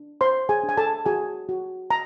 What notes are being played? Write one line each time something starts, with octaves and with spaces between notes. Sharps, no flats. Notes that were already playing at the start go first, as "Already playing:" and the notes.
Already playing: D4
C5 C6
G#4 G#5
D4
G#5
A4 A5
F#4 G#4 G#5
F#4
A#5